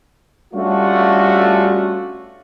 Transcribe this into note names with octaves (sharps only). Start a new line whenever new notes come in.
G3 A3 C#4 D4 F4 F#4